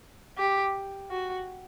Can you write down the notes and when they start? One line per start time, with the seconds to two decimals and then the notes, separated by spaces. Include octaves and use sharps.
0.38 G4
1.11 F#4